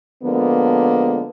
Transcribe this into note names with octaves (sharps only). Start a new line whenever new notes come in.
D3 F3 G#3 A#3 B3